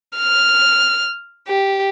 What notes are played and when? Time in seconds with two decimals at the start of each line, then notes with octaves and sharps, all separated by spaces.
0.17 F6
1.48 G4